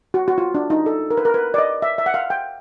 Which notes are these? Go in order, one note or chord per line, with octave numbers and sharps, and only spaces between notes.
F#4
F#4
F4
D4
D#4
A4
A#4
B4
A#4
B4
D5
D#5
E5
E5
F#5
F5
G5